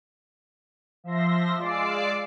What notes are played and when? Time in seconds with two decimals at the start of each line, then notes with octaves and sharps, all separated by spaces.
1.04 F3 E5 C6 A#6
1.58 G#3 F4 D5 D6 E6 C7